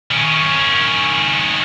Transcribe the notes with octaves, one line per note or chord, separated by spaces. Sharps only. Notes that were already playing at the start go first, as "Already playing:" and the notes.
D#3 C#4